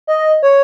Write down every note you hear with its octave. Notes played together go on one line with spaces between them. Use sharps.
D#5
C#5